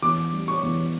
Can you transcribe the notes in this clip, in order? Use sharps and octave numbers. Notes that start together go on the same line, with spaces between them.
E2 D6
G3
C#6
E2